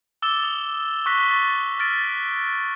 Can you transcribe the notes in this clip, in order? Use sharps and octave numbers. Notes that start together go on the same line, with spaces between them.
D6 E6 A6 E7 G7
D#6
C#6 E6 F#6 A#6 B6
A6
E6 F6 A6 D7